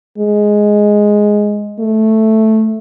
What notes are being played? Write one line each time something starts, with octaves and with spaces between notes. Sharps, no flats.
G#3
A3